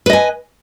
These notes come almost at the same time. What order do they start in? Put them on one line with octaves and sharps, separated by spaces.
B4 D#5 G#5